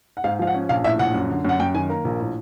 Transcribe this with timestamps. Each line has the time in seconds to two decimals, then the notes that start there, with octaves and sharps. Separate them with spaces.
0.17 F#5
0.24 G#2 F5
0.39 F3 F5
0.47 F#5
0.54 C#4
0.69 A#1 F5
0.84 A2 E5
0.99 A#1 F#5
1.14 F#2
1.30 D3
1.45 F#2 F#5
1.60 F#2 G5
1.75 D#3 G#5
1.89 A#3 A#5
2.05 A#1
2.20 A2